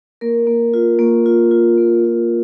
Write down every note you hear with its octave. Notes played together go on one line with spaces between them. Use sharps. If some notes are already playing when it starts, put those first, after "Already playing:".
A#3 A#4
A#3
F4
A#3
F4
F4
A#3
F4